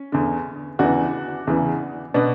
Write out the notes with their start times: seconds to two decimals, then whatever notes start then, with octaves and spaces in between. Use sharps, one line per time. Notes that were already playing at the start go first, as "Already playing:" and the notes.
Already playing: C#4
0.12 E2 D3
0.79 E2 C#3 E3 D4 F#4
1.47 E2 C#3 E3
2.14 B2 B3 D4